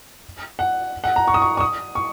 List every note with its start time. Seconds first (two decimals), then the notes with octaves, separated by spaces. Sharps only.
0.59 F#5
1.04 F#5
1.16 A#5
1.28 C#6
1.34 D#6
1.42 C#6
1.57 C#6
1.60 D#6
1.95 C#6